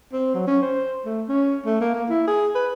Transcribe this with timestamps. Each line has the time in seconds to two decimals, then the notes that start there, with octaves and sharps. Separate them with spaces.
0.13 C4
0.35 F#3
0.47 C#4
0.62 C5
1.05 A3
1.29 C#4
1.66 A3
1.81 A#3
1.94 A#3
2.09 E4
2.28 G#4
2.55 B4